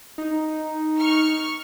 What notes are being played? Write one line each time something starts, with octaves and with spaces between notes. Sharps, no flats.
D#4
C#6 F6